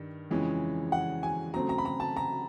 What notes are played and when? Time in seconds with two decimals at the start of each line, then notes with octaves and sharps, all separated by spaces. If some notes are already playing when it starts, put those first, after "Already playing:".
Already playing: G2 D#3
0.30 F2 C#3 E3 G#3 C#4
0.92 F#5
1.23 G#5
1.54 C#3 F#3 A3 C4 A#5
1.69 A#5
1.78 B5
1.85 A#5
2.00 A5
2.17 A#5